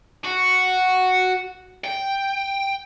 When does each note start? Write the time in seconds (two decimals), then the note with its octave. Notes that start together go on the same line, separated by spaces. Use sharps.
0.25 F#4
1.84 G5